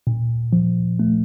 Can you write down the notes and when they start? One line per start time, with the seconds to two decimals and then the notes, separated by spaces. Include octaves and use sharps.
0.07 A#2
0.53 F3
1.00 A3